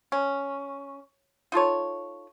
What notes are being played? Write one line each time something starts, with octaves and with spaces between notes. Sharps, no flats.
C#4
D#4 F4 A4 C#5